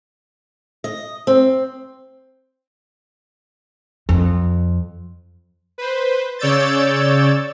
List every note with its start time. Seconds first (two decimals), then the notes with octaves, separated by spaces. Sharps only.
0.84 D#5
1.27 C4
4.09 F2
5.78 B4 C5
6.39 C#3 C#5 D5 E6 G6 A6